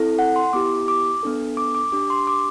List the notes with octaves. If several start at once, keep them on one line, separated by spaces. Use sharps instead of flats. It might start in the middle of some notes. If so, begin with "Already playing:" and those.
Already playing: C4 E4 A4
F#5
C6
B3 E4 G4 D6
D6
B3 D4 A4
D6
D6
D4 G4 D6
C6
D6